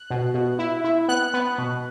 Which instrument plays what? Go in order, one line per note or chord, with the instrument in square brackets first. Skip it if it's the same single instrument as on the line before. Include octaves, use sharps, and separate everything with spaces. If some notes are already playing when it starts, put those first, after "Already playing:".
Already playing: [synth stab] F#6
B2
B2
E4
E4
B3 F#6
B3
B2